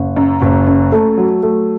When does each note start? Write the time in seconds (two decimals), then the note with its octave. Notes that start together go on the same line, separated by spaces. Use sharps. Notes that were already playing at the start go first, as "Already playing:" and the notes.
Already playing: F#1
0.16 F#2
0.42 F#1
0.67 F#2
0.92 A3
1.18 F#3
1.43 A3